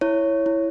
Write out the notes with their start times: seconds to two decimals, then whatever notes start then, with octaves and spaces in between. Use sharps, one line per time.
0.01 E4 C#5
0.46 E4